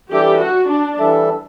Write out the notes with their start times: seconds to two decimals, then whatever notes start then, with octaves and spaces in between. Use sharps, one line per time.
0.11 E3 G3 D4 G4 A4 E5
0.40 F#4
0.70 D4
0.99 E3 G3 D4 A4 E5